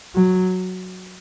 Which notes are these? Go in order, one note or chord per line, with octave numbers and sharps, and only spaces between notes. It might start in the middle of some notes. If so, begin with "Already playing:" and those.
F#3